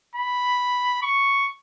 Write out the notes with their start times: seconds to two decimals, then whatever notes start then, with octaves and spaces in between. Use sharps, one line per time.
0.15 B5
1.03 C#6